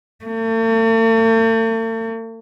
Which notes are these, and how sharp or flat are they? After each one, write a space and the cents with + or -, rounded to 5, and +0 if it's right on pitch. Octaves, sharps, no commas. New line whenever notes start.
A3 +45